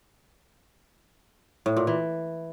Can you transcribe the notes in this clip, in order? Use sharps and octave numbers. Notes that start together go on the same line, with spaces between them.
A2
A#2
E3